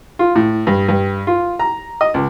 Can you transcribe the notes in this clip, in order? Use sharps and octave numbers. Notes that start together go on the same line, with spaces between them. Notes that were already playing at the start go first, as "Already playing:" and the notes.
F4
A2
G2
G2
F4
A#5
D#5
C#2